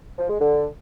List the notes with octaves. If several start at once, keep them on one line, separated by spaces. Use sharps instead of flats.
F3
G#3
D3